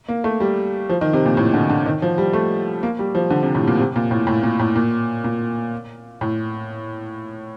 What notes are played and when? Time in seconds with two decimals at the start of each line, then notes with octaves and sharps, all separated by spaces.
0.09 A#3
0.24 A3
0.40 G3
0.90 F3
1.01 D#3
1.13 C3
1.26 A#2
1.37 A2
1.54 D3
1.70 D3
1.86 D#3
2.02 F3
2.18 G3
2.33 A3
2.83 A#3
2.99 G3
3.15 F3
3.30 D3
3.43 C3
3.55 A2
3.67 A#2
3.79 C3
3.96 A#2
4.11 A2
4.27 A2
4.43 A#2
4.59 A2
4.76 A#2
5.24 A#2
6.21 A2